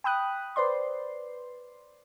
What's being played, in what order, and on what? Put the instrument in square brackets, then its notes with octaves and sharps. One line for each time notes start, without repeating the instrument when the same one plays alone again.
[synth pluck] G5 B5 D#6 F#6
B4 C5 D5 C6